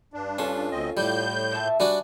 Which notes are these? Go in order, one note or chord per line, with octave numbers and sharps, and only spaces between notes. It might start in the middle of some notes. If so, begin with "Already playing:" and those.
G2 D4
C#4 F4 A4
D2 C4 D#5
A2 G3 G6
A#2 E5 A5
G3 D4 F#4 G#5